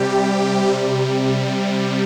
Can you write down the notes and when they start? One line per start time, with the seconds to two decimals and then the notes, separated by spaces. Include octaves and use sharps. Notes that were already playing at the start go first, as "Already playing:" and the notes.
Already playing: C3 G3 G4
0.68 C3 G3